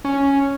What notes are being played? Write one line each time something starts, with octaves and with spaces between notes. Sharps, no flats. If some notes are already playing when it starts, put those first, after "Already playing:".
C#4